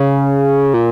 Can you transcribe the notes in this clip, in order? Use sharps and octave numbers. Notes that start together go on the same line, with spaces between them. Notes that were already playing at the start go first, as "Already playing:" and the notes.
Already playing: C#3
A#2